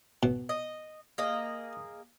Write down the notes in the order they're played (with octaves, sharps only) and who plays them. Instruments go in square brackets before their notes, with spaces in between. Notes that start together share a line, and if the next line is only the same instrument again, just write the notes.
[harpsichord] B2
[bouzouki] D#5
A#3 G#4 D#5